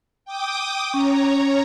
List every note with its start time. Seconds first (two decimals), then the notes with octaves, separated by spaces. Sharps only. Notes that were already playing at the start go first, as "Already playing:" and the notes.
0.25 G5 D6 D#6
0.94 C#4 C#5 A#5